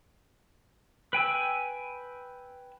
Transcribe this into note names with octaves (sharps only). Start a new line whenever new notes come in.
B4 G5 G#5 E6